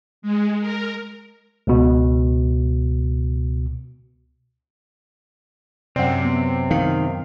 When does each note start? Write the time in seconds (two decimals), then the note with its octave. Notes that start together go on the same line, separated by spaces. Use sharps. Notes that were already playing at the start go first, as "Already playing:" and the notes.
0.22 G#3
0.61 A#4
1.67 C#2 B2
5.96 F#2 C3 C4 D5 F#5
6.25 B3
6.71 D#3 F5